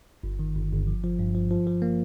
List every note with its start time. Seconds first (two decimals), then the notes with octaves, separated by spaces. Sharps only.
0.23 G1
0.39 D#3
0.56 G1
0.72 G1
0.87 F3
1.04 F3
1.19 G2
1.35 F3
1.51 F3
1.67 F3
1.82 A#3